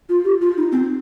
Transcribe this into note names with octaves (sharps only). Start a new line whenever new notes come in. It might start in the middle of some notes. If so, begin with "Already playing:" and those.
F4
G4
F4
D#4
C4